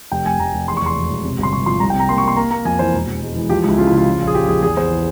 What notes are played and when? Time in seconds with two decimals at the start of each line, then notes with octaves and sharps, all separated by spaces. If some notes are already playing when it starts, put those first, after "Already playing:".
0.11 F1 G5
0.25 F1 G#5
0.39 F1 A#5
0.54 F1
0.68 E2 C6
0.77 C#6
0.82 E2 C6
0.96 E1
1.10 E1
1.25 C3
1.38 G1 C6
1.52 C3 C#6
1.66 F3 C6
1.80 C2 A#5
1.90 G5
1.94 C3
2.00 A#5
2.09 A#3 C6
2.18 C#6
2.23 A#3
2.28 C6
2.36 A#3 A#5
2.51 A#3 A#5
2.65 F2 G#5
2.79 E3 C5
2.93 E1
3.07 E1
3.22 G#3
3.35 E3
3.49 F3 G4
3.64 C#2 E4
3.78 C#3 F4
3.87 E4
3.92 C#3
3.97 F4
4.07 F3
4.20 A#1
4.27 G#4
4.34 F3 G4
4.48 A#1 G#4
4.62 E2 G#4
4.77 E2 C5
4.91 E3